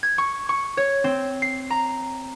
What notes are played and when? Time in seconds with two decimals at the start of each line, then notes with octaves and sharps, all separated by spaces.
0.03 G#6
0.18 C#6
0.49 C#6
0.77 C#5
1.04 C4
1.42 C7
1.70 A#5